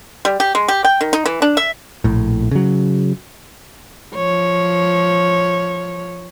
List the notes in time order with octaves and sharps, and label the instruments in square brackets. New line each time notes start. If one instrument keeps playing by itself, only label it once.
[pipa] G3
G4
G#3
G4
G5
D#3
D#4
E3
D4
E5
[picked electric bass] A#1 A2
C#3 F#3
[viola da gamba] F3 C#5